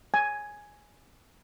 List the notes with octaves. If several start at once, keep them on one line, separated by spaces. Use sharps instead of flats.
G#5